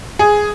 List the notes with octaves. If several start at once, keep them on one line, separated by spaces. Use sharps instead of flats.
G#4